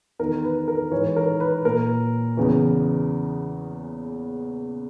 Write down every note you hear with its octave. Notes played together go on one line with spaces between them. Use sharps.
E2 D#3 A#4
B4
A#4
G#2 E3 C#5
A#4
B4
A#2 A#4
E2 C#3 E3